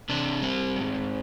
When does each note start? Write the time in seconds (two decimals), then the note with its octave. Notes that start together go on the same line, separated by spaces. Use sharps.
0.09 C3 D4
0.42 G3 C4
0.76 G#2